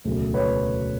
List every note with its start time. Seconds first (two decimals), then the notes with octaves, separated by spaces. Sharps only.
0.04 E1 D2 C#3 F#3
0.34 B4 C#5